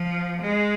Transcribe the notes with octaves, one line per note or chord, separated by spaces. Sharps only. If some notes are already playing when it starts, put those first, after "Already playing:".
Already playing: F3
G#3